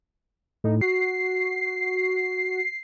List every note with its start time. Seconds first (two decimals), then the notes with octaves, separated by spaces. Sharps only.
0.64 A2 D#4
0.81 F#4 C7